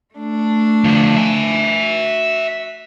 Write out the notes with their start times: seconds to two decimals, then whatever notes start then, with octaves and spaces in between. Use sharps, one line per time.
0.15 A3 D4
0.84 D3 F3
1.16 E5 G#5
1.83 F#4